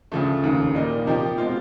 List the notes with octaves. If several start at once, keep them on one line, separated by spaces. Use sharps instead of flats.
D2 C#3 F3 A3
F1 D#2 C#3
A#2 G3 A#3 D#4
C3 F3 A#3 D#4 G4
B2 G#3 C4 F4